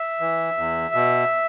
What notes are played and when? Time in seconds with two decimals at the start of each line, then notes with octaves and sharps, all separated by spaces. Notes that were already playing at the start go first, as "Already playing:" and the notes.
Already playing: E5
0.20 E3
0.57 E2
0.94 B2